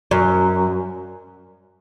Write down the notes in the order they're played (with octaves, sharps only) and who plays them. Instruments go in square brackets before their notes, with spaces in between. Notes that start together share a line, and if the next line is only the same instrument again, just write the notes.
[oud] F#2